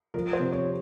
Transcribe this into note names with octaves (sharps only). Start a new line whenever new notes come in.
F3 A#4
C5
C3
C#5